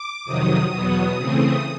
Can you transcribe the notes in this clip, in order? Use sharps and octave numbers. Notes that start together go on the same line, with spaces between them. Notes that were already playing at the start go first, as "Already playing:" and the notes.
Already playing: D6
F2 C3 D#3 F#3 D#6
E2 B2 F#3 B3
C#3 E3 A3 C4